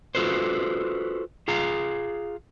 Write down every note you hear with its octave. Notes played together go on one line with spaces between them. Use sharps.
F4 F#4 A4 B4 C5
F4 G#4 F5 A#5